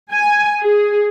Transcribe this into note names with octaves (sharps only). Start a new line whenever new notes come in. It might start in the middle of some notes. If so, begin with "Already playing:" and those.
G#5
G#4